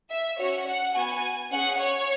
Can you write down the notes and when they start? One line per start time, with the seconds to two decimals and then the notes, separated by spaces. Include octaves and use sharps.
0.10 E5
0.39 C#4 F#4 C#5
0.67 F#5
0.95 B3 F#4 G#5
1.51 C#4 G#4 F#5
1.80 C#5